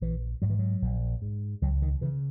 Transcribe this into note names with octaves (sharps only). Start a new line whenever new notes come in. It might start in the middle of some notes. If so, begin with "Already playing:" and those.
A#1 E3
G#2 F#3
E3
F#3
A#1
G#2
C#2 F#3
D#3
C#3 E3